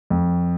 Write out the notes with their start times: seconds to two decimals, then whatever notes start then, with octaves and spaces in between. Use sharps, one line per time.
0.10 F2